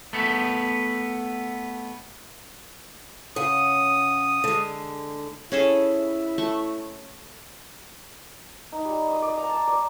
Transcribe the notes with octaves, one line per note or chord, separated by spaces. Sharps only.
A3 B3
C#3 F#5 D#6
D3 G#3
C#4 E4 G#4 A4
A3 C#6
D#4
G3
D#6
D5
A#5
A5
D5